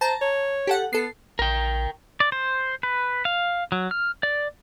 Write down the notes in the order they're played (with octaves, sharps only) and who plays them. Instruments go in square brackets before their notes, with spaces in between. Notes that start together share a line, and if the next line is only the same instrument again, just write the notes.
[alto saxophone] C5 [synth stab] A5 A#5
[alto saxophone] C#5
[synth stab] G4 A4 F#5
[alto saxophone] B3 [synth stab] A4 C7
[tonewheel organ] A#1 [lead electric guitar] A#4 G5
[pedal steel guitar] D5
C5
B4
F5
F#3
F6
D5